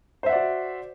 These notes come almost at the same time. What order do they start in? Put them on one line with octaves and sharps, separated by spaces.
C5 E5 F#5 D5 F#4